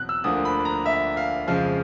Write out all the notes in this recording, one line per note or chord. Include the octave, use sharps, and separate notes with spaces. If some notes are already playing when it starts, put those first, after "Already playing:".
Already playing: E2 B2 F#3 C4 F#6
E6
D2 D3 F3 A#3 D#6
B5
A#5
E5
F5
F2 C#3 F3 G#3 F5